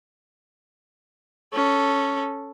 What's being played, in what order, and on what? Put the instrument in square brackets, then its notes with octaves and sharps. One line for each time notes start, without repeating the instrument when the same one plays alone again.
[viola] C#4 A4